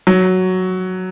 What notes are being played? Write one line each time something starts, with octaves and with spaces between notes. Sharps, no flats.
F#3